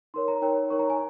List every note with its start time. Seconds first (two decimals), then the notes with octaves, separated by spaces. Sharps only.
0.14 D#4 A#4 C#5 C6
0.28 A#5
0.42 D#4 A#4 C#5 G5
0.70 D#4 A#4 C#5 C#6
0.79 A#5
0.90 G#5